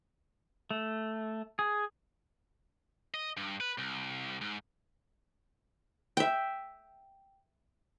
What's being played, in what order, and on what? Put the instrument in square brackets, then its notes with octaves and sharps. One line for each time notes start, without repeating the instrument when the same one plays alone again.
[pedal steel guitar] A3
G#4
[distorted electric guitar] D#5
G2
B4
C2
G#2
[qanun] E5 G5